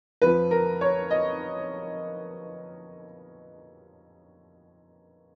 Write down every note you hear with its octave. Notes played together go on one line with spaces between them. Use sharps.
F2 F3 B4
A#4
C#5
D#5